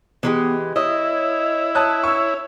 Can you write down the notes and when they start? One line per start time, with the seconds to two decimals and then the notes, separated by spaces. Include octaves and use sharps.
0.23 E3 G#3 B3 G4
0.76 E4 C#5 D#5
1.75 C#5 A5 D#6 F#6
2.03 C#6 E6